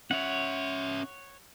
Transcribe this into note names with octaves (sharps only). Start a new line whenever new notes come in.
C#4 C#5 E5 F#5